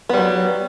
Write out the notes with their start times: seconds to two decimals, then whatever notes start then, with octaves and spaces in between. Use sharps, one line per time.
0.09 B3
0.13 G3
0.17 F#3